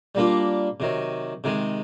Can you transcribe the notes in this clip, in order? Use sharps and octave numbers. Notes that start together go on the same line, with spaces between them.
G3 A#3 D4 F4
C3 D#3 F#3
C3 D#3 G#3